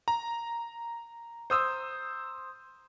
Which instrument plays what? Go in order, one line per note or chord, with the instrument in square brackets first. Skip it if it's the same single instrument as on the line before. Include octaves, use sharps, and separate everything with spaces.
[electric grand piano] A#5
[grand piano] C5 D#6 E6